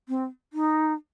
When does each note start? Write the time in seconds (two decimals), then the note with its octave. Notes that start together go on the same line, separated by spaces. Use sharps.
0.08 C4
0.53 D#4